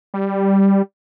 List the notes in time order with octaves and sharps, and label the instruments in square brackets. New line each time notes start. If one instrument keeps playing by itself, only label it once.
[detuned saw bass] G3